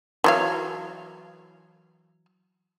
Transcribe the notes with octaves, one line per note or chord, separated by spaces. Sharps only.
E3 F#3 F5